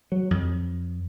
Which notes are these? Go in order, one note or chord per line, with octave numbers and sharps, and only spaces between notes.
F#3
F2